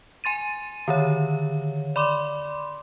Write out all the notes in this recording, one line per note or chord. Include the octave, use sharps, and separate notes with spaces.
G#5 C6 A6 D#7
D3 D#3 C#5
D5 B5 C6 D6